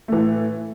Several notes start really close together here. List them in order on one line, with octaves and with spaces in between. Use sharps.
A3 E3 A2